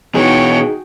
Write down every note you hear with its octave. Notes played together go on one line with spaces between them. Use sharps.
B2 E3 D#4 F#4 G#4 C#5 G5